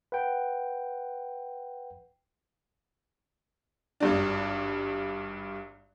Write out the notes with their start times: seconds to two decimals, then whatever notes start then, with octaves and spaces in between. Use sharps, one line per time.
0.12 B4 F#5 G5
4.00 G#1 G2 D4